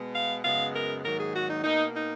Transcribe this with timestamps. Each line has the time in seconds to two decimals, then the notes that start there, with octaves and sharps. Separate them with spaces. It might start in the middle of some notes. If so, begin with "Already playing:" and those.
Already playing: B2 G#3 B3
0.13 F5
0.43 F#2 C#3 G#3 B3 F5
0.73 A#4
1.04 G#2 D#3 F#3 A#3 A#4
1.19 G#4
1.34 F#4
1.49 D#4
1.63 B2 A#3 D#4
1.94 D#4